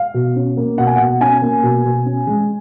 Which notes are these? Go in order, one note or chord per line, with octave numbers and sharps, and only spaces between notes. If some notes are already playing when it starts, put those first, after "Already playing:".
Already playing: F5
B2
C#4
A#3
B2 F#5
G#5
B2 F#5
C#4 G#5
A#3
B2
B2
C#4
G#3